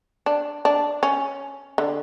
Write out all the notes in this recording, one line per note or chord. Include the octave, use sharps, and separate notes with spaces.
D4
D4
C#4
D3